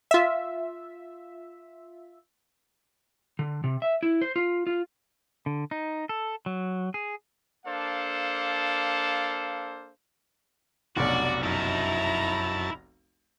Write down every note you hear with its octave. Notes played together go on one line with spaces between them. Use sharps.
F4 E5
D3
C3
E5
E4
C5
F4
F4
D3
D#4
A4
F#3
G#4
A#3 D4 A4 C5 F5
F1 B1 D4 F#4 D5
F#2 D#4 E4 A5 A#5